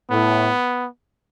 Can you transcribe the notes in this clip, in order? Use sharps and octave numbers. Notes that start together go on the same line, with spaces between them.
A2 B3